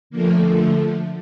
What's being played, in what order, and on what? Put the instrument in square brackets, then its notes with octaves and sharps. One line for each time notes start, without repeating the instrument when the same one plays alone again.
[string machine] D3 F3 A3 A#3
D3 F3 A3